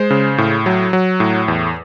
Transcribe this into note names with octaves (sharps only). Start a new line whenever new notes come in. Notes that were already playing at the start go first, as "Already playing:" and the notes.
Already playing: G#3 C5
C#3
A2
F#3
F#3
A2
E2